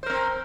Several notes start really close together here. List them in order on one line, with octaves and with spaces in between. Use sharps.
C5 A#4 C4